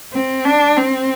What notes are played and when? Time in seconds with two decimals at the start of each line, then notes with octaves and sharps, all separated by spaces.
0.13 C4
0.45 D4
0.77 C4